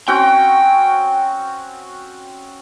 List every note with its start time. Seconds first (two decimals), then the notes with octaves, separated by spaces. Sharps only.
0.08 C4 C#4 F#4 G5